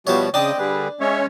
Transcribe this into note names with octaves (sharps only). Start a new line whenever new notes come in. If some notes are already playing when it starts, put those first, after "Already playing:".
B2 F3 G3 F#4 C#5 E5 A5
C#3 C4 D4 D#5 G5 A5 D#6
D3 G3 G#4 B4
G#3 C#4 C#5 E5